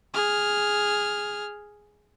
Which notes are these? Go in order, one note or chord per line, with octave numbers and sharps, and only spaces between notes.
G#4 F6